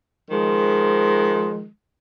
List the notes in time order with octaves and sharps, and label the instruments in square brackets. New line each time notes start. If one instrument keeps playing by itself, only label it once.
[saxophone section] D#3 F3 G#3